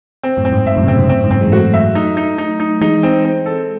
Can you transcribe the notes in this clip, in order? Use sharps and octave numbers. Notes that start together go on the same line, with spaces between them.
C4
F#2 A2
C4
G#2
G#2 E5
F#2 A2
C3
A2 C#3 C4
G#2 C3
F#2 A2 C4
G#2
F#2 A2 C4
E3 G#3
F#3 A3 F#4
E5
D#4
D#4
D#4
D#4
E3 G#3 D#4
C4
C4
A4